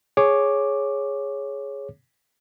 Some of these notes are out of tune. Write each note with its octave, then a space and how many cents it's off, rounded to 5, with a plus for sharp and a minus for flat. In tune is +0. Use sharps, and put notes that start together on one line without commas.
G#4 +0 C#5 +0 D6 +10